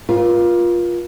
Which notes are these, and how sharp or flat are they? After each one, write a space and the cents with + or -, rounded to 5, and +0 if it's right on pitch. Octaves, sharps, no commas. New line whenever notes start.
F4 +5 A#4 +45